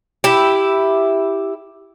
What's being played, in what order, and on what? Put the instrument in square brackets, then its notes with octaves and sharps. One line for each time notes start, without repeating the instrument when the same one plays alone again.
[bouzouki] E4 G4